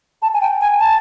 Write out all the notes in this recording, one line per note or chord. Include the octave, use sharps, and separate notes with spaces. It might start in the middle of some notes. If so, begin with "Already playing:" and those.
A5
G#5
G5
G#5
A5